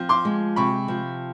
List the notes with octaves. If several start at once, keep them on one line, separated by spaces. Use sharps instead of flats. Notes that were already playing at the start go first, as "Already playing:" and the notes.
Already playing: F3 C4
C6 D6
G#3
C3 B5 C#6
F3